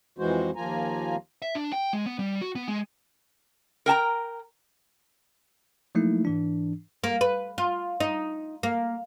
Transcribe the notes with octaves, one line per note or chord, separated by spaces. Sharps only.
F2 E3 G#3 F#4 C5
D#2 F3 A#3 F4 G#5 A#5
E5
D4
G5
G#3
B3
G3
F#4
B3
G#3
A#4 G5 A5 A#5
F3 F#3 A3 A#3 D#4 E4
G#2 E3 D4
A#3
B4
F4
D#4
A#3